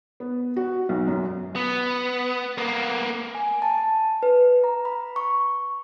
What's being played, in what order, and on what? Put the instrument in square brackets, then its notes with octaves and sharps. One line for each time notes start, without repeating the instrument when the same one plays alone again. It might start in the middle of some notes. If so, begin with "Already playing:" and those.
[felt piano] B3
F#4
B1
F#2
[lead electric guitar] B3
A#3 B3
[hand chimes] G#5
A5
B4
A#5
B5
C#6